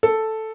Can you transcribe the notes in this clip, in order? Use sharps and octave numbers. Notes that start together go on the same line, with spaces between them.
A4